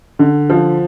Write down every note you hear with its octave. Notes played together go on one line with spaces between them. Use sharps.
D3
F3